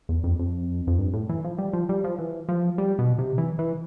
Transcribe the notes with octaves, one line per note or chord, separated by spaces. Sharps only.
E2
F2
F2
F2
G2
A2
E3
F3
G3
F3
G3
F3
E3
F3
G3
B2
C3
E3
E3